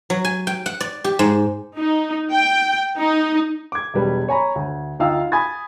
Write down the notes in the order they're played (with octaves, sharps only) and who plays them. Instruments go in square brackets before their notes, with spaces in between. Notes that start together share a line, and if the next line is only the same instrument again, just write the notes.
[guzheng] F#3
G#5
G5
F#5
D5
G4
G#2
[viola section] D#4
G5
D#4
[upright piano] D6 G#6
E1 F#3 G3 B4
C#5 G#5 A#5 B5
D2
D2 D#4 F4 F5 G5 E6
G#5 B5 D#6 G#6 A6